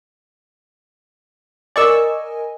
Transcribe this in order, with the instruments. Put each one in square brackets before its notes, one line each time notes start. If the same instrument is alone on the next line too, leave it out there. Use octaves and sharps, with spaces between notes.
[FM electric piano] A#4 D#5 G#5 [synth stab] D5 C#6 E6